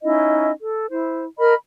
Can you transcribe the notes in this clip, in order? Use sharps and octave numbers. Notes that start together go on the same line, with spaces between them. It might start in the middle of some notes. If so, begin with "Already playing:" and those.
C#4 D#4 E4 D#5
A4
E4 C5
A#4 D#5 B5 F6